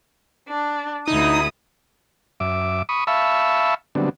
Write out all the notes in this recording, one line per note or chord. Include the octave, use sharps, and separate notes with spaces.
D4
D2 D#4 E4 D#6
F#2 E5 D6
B5 C#6 D#6
E5 F5 A5 B5 C#6 E6
D3 F#3 G3 B3 C4 D4